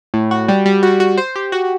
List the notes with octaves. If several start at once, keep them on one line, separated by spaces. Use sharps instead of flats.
A2
F#4
G3
G3
F#4
F#4
C5
G4
F#4